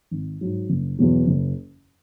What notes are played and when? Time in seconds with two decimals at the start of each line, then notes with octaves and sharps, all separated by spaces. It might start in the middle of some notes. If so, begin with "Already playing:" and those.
0.11 G#1
0.41 G#2 F#3
0.69 F#1
0.99 E2 B2 F#3
1.27 F#1